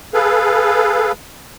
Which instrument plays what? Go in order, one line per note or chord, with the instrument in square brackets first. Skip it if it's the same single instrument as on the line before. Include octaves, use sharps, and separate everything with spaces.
[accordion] G#4 A4 B4 F5